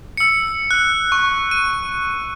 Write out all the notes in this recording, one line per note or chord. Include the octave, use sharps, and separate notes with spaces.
E6 C#7
F#6
C#6
D#7